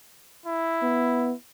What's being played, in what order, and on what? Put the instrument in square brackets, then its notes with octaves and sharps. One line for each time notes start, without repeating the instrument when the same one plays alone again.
[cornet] E4
[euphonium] B3